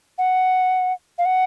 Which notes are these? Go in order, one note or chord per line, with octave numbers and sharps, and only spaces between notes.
F#5
F5
F#5